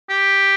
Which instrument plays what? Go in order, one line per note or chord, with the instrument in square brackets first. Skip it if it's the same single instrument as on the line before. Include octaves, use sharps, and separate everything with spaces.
[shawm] G4